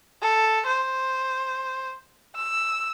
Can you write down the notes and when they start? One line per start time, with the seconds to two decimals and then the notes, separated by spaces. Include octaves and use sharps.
0.22 A4
0.67 C5
2.36 E6